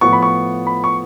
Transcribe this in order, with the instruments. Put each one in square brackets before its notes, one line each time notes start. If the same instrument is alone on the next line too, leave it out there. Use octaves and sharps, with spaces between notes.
[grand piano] A2 F3 B3 C#6
B5
C#6
B5
C#6